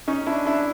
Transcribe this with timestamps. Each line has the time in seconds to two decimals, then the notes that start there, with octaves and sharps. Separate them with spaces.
0.08 C#4 D#4
0.27 D4 E4
0.46 D4 E4